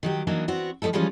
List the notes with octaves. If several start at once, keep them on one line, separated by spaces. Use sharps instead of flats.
D#3 F#3 G4
E3 F#3 A#3 D4 D#4
B3 C4 F#4
F3 G3 A3 D#4 A4
E3 F3 G3 G#3 C#4 F4